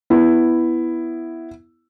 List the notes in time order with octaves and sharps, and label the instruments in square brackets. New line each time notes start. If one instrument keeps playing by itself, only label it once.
[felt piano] B3 E4